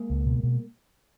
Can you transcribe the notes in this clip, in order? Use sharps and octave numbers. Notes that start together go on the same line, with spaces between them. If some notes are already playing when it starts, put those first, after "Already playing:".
Already playing: G#3 A#3
C#2
B2
B2